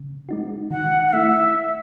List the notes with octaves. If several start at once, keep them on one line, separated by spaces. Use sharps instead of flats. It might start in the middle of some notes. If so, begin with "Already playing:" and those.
Already playing: C#3
G#3 D#4 F#4
D#3 F#5
F#5
A3 E4 E5